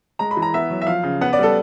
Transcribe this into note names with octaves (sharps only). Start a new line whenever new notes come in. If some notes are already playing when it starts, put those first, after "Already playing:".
G#3 A#5
B5
E3
A#5
B3 E5
F#3
E5
F3 F5
C#3
B3 F#5
D5
G3 A4